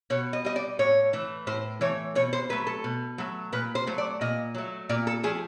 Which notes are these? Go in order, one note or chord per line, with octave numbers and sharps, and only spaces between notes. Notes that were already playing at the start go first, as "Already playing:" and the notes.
B2 C#5
D#5
G3 D#5
D5
A2 C#5
E3 A3
A2 C5
E3 A3 C#5
B2 C#5
C5
F#3 A3 B4
A4
B2
F#3 A3
A#2 B4
C5
F#3 A3
D5
A#2 D#5
F#3 A3
A#2 D5
A4
F3 A3 G#4